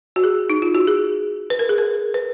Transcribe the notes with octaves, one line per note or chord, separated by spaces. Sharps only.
F#4
G#4
D#4
F4
F#4
G#4
B4
A#4
G#4
A#4
B4